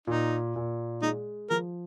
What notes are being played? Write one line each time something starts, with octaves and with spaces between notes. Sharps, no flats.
A#2 D#4
A#2
G#3 D#4
F3 A#4